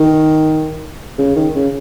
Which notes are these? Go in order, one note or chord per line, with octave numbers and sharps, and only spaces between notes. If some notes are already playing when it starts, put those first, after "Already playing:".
Already playing: D#3
C#3
D#3
C#3